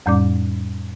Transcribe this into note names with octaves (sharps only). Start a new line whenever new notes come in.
F2 A2 G3 C#4 D5 D6